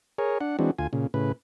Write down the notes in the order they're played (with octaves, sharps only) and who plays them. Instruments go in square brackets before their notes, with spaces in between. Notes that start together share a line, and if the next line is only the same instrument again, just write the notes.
[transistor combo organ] G#4 A#4 C#5
D4 F#5
E3 G#3 C4 D4 F#4
D2 F4 G#5
A#2 C#3
A2 C#3 B4